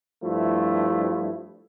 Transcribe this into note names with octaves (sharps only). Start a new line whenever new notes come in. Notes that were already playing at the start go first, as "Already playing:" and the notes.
G2 F3 A3 E4